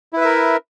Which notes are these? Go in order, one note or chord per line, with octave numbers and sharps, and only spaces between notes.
E4 A#4 B4 E5